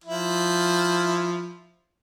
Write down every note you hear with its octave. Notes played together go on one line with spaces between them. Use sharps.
F3 E4